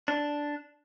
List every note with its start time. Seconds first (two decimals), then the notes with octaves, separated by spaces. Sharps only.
0.08 D4